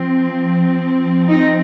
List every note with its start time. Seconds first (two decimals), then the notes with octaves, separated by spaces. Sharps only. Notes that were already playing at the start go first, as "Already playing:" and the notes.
Already playing: F3 C4
1.30 D#4